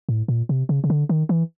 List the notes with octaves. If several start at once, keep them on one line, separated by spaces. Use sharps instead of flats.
A2
A#2
C3
C#3
C#3
D3
D#3
E3